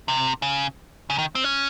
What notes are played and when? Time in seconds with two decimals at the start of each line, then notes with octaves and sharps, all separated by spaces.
0.08 C3
0.42 C#3
1.10 C#3
1.18 D#3
1.35 C4
1.44 C#4